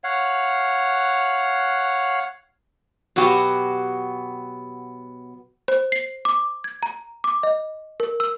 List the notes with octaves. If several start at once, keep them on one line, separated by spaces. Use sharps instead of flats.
C#5 F5 F#5
B2 F#3 B3 F#4 G4
C5
C7
D6
G#6
A#5
D6
D#5
A#4
E6